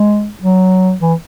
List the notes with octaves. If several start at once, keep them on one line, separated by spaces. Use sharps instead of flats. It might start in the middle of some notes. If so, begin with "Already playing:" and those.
Already playing: G#3
F#3
E3